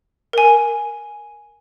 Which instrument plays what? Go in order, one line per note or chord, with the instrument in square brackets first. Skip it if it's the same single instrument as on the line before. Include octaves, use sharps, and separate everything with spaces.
[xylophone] A#4 G#5